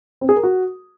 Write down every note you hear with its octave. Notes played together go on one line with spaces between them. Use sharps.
C4
G#4
A#4
F#4